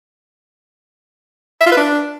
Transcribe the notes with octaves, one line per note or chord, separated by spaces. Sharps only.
E5
F4
B4
D4